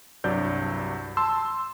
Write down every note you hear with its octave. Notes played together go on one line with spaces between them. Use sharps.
C2 G2 F#3 D5 G6
A5 C6 E6